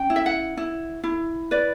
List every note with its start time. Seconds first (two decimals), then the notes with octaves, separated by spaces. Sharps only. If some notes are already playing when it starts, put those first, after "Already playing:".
Already playing: C#4 G5
0.10 E4
0.16 E5
0.26 F#5
0.57 E4
1.04 E4
1.51 B4 D5